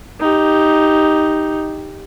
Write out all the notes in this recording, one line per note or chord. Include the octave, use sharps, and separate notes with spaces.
D#4 G4